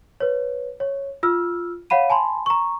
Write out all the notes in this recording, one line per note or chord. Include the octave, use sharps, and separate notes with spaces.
B4 C#5
C#5
F4 E6 F6
C#5 F5 F#5 B5 D#7
G#5 A5 B5 C6
A#5 C#6